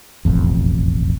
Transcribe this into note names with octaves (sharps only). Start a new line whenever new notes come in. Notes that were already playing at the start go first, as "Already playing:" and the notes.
E1 A1 F2